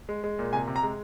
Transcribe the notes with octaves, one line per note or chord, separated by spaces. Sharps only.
G#3
G#3
A#2
C3 G#5
C3
A#5
G#3